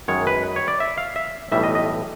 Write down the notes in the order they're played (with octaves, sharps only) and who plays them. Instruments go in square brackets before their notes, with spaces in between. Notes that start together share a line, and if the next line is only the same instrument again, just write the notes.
[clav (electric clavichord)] F#2 D#3 G#3 C#5
B4
C#5
D5
E5
F5
E5
B1 A2 E3 G3 E5
D#5
D#5